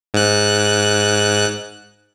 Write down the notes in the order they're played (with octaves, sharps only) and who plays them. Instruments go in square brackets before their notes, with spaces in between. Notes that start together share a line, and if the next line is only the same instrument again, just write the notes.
[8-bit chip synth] G#2 F#6